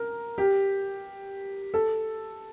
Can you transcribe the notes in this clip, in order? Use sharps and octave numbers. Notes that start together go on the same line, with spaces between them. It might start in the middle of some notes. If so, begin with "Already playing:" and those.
Already playing: A#4
G4
A4